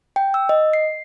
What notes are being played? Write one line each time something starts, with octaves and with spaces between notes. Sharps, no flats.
G5
E6
D#5
C7